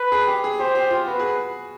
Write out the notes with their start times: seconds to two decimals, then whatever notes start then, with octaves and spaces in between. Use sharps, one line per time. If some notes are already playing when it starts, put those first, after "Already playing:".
Already playing: B4
0.12 G#4
0.27 G4
0.44 G#4
0.60 G4 C5
0.75 G4
0.91 F4
1.06 F#4 B4
1.20 G#4